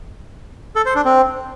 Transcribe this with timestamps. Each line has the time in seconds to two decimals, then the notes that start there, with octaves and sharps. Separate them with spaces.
0.76 A4
0.86 C5
0.95 D4
1.05 C4